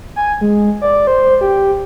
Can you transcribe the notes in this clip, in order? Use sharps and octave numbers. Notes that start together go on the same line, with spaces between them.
G#5
G#3
D5
C5
G4